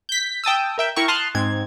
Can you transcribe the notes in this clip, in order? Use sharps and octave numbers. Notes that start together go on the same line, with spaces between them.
G6 B6
G5 A5 D#6 E6
A#4 E5 G5
E4 A#4 G5 C#6
A5 C6 D#6 F6 F#6
G#2 C4 G#6